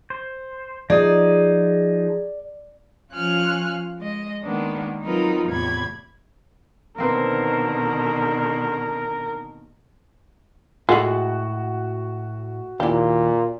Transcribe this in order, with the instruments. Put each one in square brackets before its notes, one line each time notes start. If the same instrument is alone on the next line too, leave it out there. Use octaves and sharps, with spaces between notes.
[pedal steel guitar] C5
[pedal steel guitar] F3 D#4 D#5 [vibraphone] G#4 [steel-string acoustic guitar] D5
[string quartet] F3 C#4 F4 G#5 F6 F#6
G#3 D#5
D#3 G#3 A#3 B3 D4
F#3 C4 D#4 F4 A#4 B4
E2 A2 C3 B5 G#6
[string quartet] B2 D3 D#3 [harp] A#3 C4 B4 [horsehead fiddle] A#4
[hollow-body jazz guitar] A2 A4 B5 [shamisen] G#3 [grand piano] F#4
[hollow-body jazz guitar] D#2 E4 [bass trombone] A#2 [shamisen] G4